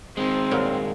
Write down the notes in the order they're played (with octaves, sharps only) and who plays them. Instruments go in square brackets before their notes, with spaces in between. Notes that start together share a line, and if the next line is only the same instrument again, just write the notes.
[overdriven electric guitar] D#3 G#3 [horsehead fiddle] C4
[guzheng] A#2 F#3 G3